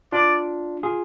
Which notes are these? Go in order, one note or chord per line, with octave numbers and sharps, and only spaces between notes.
D4 F4 D5
F4 G#4